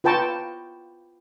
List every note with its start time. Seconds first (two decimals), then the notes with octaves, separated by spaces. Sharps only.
0.04 F4 B4 G5 A5 A#5 C#6